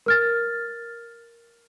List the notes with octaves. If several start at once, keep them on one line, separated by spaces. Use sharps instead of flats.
A#4 F6 A6